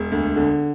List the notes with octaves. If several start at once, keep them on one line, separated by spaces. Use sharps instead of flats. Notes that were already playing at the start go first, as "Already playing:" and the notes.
Already playing: E1
D2
D3